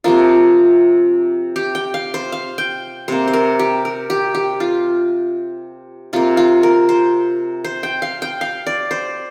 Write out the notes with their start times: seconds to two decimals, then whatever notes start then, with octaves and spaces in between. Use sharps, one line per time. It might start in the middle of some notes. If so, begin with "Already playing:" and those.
0.04 C3 F3 A#3 F4
1.56 G4
1.75 G5
1.94 F5
2.14 C5
2.32 F5
2.58 G5
3.08 C3 A#3 C5
3.28 C5
3.33 A#4
3.59 G4
3.85 A#4
4.10 G4
4.35 G4
4.60 F4
6.13 C3 A#3 F4
6.37 F4
6.63 A#4
6.89 C5
7.64 C5
7.83 G5
8.02 F5
8.22 G5
8.41 F5
8.67 D5
8.91 C5